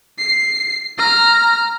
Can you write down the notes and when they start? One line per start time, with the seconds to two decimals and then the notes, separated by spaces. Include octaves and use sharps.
0.18 C7
0.98 A#5 F6